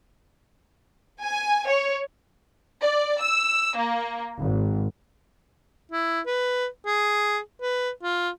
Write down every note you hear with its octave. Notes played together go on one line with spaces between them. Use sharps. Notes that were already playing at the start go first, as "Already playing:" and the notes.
G#5
C#5
D5
E6
A#3
G#1
E4
B4
G#4
B4
F4